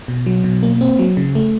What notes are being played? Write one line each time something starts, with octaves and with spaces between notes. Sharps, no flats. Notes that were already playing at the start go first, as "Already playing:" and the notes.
B2
F#3
B2
A#3
C4
F#3
C#3
A3